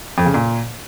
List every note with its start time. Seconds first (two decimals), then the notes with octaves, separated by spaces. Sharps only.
0.18 F2
0.26 C#3
0.34 A#2